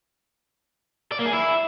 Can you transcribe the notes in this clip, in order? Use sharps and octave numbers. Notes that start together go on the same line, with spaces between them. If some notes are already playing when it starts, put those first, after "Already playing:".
D5
A#3
G#4
E4